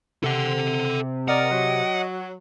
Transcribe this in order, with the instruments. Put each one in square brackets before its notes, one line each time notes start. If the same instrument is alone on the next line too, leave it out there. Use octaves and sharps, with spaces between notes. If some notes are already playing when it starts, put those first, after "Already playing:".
[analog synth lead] C3 [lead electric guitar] A4 F#5
[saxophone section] A#4 D5 [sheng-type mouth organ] D#5 [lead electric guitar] F#5
[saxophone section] F#3